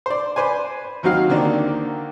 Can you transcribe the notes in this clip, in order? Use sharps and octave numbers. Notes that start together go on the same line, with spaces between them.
C5 D5
B4 C5 D5 G#5
D#2 F#3 C4 D#4 F#4 F5
D3 D#3 A#3 C4 D4